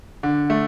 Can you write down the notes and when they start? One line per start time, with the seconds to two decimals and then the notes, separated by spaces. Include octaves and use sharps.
0.23 D3
0.50 A3